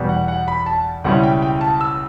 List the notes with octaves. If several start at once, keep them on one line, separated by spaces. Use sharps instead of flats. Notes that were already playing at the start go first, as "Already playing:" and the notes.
Already playing: E2 B2 G3
F#5
F#5
B5
A5
C#2 B2 G3 C#4 E4 F#5
G5
G5
A5
E6